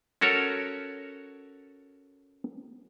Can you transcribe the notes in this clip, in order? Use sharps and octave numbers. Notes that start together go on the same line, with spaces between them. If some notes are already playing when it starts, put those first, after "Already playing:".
C#4 F#4 A4 A#4 C#5